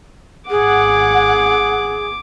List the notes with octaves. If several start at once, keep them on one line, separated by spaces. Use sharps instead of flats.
G#1 G#4 F#5 D6